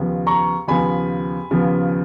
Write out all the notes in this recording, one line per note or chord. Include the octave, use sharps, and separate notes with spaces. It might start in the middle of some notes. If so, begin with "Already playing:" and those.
Already playing: D#2 C#3 F3 B3
A#5 C#6
D#2 C#3 F3 B3 G#5 B5
D#2 C#3 F3 B3